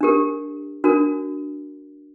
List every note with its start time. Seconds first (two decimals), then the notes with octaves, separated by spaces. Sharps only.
0.01 D4 G4 A#4
0.84 D4 F#4 A#4